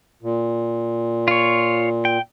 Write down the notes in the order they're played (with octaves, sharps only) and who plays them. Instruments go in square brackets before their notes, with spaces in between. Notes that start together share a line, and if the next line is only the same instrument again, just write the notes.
[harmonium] A#2
[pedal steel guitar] F4 C#5
G5